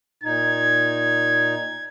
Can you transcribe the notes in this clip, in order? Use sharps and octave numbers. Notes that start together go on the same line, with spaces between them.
A#2 D#4 G#6